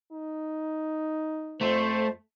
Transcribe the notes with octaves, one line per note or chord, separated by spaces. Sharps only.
D#4
F2 A3 C5